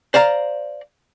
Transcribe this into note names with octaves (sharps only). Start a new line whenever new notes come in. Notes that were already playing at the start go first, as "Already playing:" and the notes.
C5 D5 F5 A#5